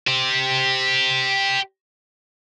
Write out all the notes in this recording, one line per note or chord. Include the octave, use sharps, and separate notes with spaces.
G4 C5